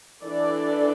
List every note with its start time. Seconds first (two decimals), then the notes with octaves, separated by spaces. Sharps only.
0.23 E3 D4 A4 D5